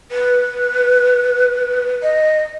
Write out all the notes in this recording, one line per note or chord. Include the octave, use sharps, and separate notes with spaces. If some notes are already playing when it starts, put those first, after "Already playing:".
B4
D#5